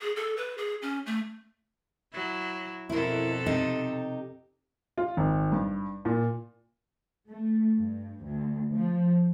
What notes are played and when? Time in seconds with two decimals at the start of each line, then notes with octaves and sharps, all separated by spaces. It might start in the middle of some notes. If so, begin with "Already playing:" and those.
0.02 G#4
0.16 A4
0.37 B4
0.58 G#4
0.82 C#4
1.06 A3
2.13 F#3 E4
2.89 F2 B2 E4 A4 A#4
3.46 C3 D#4 G4
4.98 F4
5.17 G#1
5.52 G2
6.05 A#2
7.28 A3
7.78 G2
8.26 D2
8.74 F3